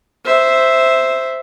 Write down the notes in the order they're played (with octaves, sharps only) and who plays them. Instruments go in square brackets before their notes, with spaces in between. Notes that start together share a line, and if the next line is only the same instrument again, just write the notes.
[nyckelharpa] C5 E5